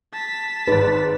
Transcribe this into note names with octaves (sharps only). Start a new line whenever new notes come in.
A5 B6
G#1 G#2 B4